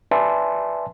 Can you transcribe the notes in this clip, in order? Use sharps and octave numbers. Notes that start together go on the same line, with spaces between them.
B4 D5 E5 G#5 A5 C6